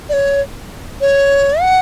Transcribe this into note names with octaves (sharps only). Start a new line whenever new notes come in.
D5
C#5
C#5
F#5